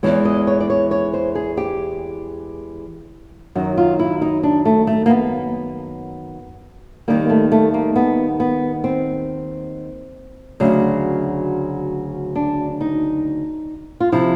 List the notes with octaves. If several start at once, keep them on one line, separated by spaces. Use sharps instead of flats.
E2 C3 E3 G#3 C#5
D#5
C#5
D5
C#5
C#5
C5
G#4
G4
F#2 D#3 F#3 F#4
F4
E4
D#4
D4
A3
A3
A#3
B3
D#2 D#3 G3 A#3
A3
A3
A#3
B3
B3
C4
D2 C#3 F#3
D4
D#4
F4
C3 F3 E4